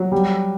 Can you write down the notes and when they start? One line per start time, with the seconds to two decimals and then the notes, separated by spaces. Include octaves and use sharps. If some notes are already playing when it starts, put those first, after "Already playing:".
Already playing: F#3
0.12 G3